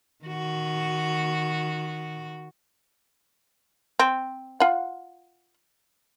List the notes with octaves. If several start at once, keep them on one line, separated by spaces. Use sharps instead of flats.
D#3 F#4
C4
F4 F#5